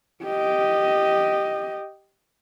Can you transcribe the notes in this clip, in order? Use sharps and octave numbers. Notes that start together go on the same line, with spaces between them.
G4 D#5